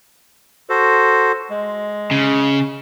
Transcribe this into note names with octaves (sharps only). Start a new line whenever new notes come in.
F#4 A4 C5
G#3
C#3